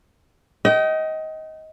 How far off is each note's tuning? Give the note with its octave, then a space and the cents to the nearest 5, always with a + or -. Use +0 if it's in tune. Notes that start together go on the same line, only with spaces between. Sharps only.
D#5 +20 G5 -30